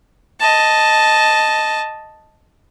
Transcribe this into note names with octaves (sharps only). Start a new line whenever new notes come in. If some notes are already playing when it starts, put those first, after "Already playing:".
D#5 A5